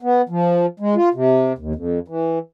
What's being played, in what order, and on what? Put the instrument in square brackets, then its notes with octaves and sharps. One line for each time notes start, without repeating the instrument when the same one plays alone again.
[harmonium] B3
F3
G#3
F4
C3
D#2
F2
E3